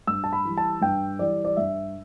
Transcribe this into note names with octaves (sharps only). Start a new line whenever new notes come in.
G2 E6
A5
B5
E3 G3
A5
G2 G5
E3 G3 D5
D5
G2 E5